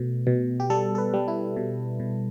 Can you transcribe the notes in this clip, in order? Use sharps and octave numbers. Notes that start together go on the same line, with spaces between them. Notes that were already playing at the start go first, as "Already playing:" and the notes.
Already playing: B2 A3
B2
G4
G3 A4
A4
B4
G3
E4
B2
B2